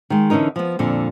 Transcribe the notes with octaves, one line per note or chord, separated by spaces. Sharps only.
D#3 G#3
D3 E3 C#4 D#4 A#4
F3 B3
F2 A#2 D3